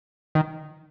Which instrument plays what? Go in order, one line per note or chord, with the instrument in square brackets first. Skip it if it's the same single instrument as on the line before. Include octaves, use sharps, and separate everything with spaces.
[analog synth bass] D#3